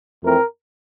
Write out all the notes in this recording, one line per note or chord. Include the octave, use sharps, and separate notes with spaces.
F2 E3 A3 C4 A#4